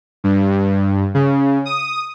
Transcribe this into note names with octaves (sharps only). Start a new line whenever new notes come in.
G2
C#3
D#6